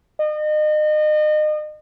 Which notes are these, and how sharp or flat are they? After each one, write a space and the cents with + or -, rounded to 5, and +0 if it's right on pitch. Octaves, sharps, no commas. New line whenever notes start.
D#5 -35